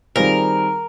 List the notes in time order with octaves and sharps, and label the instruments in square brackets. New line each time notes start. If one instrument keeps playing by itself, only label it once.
[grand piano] D#3 G3 C4 F4 G#4 [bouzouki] A#4